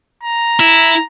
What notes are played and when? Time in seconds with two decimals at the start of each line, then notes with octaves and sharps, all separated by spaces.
0.23 A#5
0.60 E4